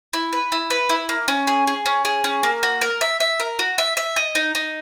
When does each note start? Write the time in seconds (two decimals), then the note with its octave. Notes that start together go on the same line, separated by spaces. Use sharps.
0.13 E4
0.33 B4
0.52 E4
0.70 B4
0.89 E4
1.09 A#3
1.28 C#4
1.47 G#4
1.67 G#4
1.86 C#4
2.05 G#4
2.24 C#4
2.43 A#3
2.63 F#4
2.81 A#4
3.01 E5
3.20 E5
3.40 A#4
3.59 F#4
3.78 E5
3.97 E5
4.16 D#5
4.35 D#4
4.55 D#4